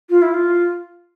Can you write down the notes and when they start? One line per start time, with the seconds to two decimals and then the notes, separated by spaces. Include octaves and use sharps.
0.10 F4
0.22 E4
0.34 F4